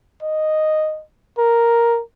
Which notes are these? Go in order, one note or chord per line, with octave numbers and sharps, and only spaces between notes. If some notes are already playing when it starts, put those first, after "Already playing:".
D#5
A#4